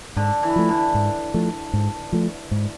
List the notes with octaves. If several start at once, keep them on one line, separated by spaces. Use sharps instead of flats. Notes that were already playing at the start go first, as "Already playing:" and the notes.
G#2 D3
E3
F3 A3
D3
G#2
F3 A3
G#2
F3 A3
G#2